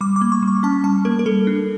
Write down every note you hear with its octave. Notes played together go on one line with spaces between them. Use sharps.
G3 D6
D6
A#3
C#6
G3
C#6
C#4 A5
G3 A5
A#3 A#4
A#4
G3 A4
D4